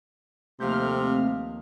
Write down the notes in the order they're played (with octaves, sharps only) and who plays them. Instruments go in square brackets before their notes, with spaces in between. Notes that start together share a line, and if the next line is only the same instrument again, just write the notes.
[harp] D#2 F3 G6 [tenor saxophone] C3 [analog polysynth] A3 C4 F6